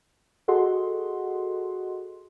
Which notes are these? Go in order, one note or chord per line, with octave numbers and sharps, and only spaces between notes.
F#4 G#4 A4 D#5 F#5 C6